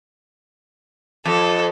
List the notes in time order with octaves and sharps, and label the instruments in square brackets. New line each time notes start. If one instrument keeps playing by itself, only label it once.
[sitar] F2 [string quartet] A4